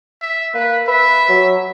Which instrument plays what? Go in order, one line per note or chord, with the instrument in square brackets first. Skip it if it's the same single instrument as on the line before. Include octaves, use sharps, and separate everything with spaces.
[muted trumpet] E5
[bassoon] A#3 [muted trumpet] B4
[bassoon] B4 [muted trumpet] E5
[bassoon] F#3